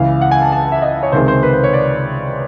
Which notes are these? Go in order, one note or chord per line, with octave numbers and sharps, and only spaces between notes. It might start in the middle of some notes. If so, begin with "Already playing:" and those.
Already playing: C#2 C#3 E3 F5
F#5
G#5
A5
A5
A5
E5
D#5
C#5
C#2 C3 D#3 G#3 C5
C5
B4
C5
C#5
D5